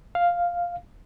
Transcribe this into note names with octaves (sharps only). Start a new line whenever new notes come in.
F5